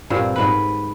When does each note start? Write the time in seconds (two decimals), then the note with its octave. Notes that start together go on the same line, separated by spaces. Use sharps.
0.10 G2 A#2 C4
0.36 G#2 B4